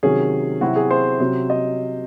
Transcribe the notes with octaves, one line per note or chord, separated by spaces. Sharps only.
C3 D#3 F#3 C#4 G#4
C3 F#3 C4 E4 F#4
G#4
C5
C3 F#3 C#4
D#5